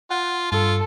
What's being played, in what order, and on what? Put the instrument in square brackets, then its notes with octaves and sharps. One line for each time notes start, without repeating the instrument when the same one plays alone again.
[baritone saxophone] F4 [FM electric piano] F#5
[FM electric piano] G2 [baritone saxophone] F4 [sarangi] A4